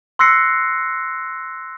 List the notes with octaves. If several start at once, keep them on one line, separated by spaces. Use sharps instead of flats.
C6 E6 F#6 A#6 C7 C#7